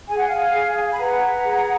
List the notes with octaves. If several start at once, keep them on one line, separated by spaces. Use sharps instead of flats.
G#4 G#5
F#5
F5 G#5
G#4
B5
B4 F#5 A#5
G#4